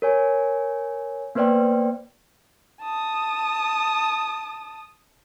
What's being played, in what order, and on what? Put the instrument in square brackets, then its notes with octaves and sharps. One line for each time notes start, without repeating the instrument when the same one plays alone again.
[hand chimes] A#4 C#5 G#5
A#3 B3 B4 C5 D5 G5
[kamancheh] A5 D#6